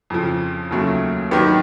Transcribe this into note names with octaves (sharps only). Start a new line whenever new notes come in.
F2 C#3 F3
D#2 C#3 F#3 A3
D#3 F#3 B3 D4 G4